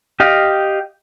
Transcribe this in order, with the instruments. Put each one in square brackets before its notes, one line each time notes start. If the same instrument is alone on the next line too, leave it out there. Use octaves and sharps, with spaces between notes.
[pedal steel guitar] G4 D#5 F5 G5